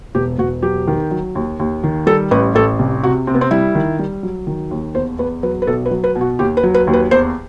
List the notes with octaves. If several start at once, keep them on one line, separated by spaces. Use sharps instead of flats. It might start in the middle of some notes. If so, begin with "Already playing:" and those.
E1 G4
E1 F#4
F#3 G4
D#3
F#3
D#2
D#2
D#3
G3 A4
A1 B4
A1 A4
C2
C3 F#4
C3 C4
B3
C4
G3 E4
D#3
G3
F#3
D#3
D#2
E2 C5
E2 B4
F#3 B4
B4
B1 A4
B4
F#3
B4
B2
F#4
D#2 G4
B4
F#3
B4
D#2
B4
E2 C5